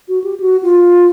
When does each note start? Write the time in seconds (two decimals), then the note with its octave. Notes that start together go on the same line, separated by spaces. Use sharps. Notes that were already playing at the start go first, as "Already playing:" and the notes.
0.09 F#4
0.24 G4
0.40 F#4
0.63 F4